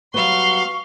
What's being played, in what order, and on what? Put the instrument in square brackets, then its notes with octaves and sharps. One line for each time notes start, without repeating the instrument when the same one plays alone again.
[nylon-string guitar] F#3 G3 B3 [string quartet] F5 C6 [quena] C#6 [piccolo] G7